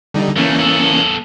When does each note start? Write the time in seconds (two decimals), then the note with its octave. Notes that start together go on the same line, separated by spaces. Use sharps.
0.14 D3 G3 D#4
0.36 D3 E3 A3 A#3 C#4
0.59 B3 A4